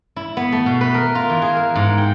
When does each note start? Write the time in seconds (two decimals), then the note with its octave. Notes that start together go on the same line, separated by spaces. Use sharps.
0.16 E4
0.37 B3
0.52 A3
0.66 B2
0.81 B4
0.94 A#4
1.15 F4
1.30 E3
1.42 G#4
1.56 A#4
1.76 G#2
1.98 G5